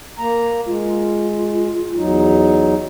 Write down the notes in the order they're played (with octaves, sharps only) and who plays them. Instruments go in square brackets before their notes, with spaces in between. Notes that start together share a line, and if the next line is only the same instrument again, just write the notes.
[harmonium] A#3 A#5
[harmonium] G#3 [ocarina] F4
[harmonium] E2 F#3 D#4